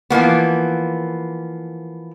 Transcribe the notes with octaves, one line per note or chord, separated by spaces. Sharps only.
E3 F3 A#3 B3